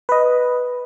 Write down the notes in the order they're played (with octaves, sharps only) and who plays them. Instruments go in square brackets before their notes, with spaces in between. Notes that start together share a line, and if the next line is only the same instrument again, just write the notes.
[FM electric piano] B4 D#5